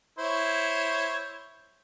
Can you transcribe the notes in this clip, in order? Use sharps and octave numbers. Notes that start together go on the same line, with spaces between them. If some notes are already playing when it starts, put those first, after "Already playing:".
E4 C5 C#5